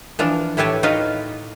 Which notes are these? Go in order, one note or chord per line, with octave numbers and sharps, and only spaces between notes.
E3 F3 D4
A2 E4 G4 B4 C#5 A5
D#4 F4 F#4 B4 F5